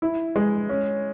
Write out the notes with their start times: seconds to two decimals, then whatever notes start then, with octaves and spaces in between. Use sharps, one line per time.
0.02 E4
0.36 G#3
0.69 C#4